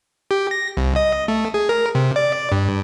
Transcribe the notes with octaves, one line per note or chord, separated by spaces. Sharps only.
G4
A#6
C2
D#5
A3
G#4
A#4
C3
D5
G2